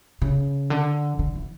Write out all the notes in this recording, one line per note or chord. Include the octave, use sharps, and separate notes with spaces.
C#3
D3
D3
E3